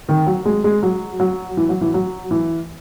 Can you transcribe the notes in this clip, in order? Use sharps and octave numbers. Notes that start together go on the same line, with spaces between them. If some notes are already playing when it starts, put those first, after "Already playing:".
D#3
F#3
G#3
G#3
F#3
F#3
E3
F#3
E3
F#3
E3